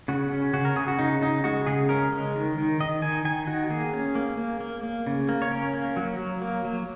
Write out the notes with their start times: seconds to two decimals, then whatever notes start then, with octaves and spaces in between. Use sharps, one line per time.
0.08 C#3 F#4
0.31 C#4
0.53 C#3 F#4
0.65 A#4
0.76 C#3 G#4
0.88 F#4
0.99 C#3 D#4
1.21 C#3 D#4
1.44 G#3 F#4
1.66 C#3 G#4
1.89 C#4 A#4
2.12 G#3
2.35 D#3
2.58 D#3
2.80 D#3 D#5
3.02 D#3 G#5
3.25 D#3 G#5
3.47 D#3 F#4
3.70 A#3 G#4
3.94 C#4
4.15 A#3
4.38 A#3
4.61 A#3
4.83 A#3
5.07 C#3
5.29 A#3
5.42 C#5
5.51 C#4 A#4
5.73 A#3
5.97 F#3
6.18 F#3
6.42 A#3
6.65 F#3